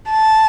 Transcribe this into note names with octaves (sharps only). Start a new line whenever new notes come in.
A5